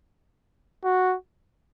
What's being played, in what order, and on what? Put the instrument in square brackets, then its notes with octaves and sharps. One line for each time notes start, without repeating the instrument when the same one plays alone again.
[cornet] F#4